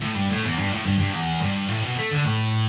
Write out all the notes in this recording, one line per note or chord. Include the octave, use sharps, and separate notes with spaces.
A2
G2
A2
E2
G2
A2
G2
G2
E2
G2
A2
B2
A3
D3
A2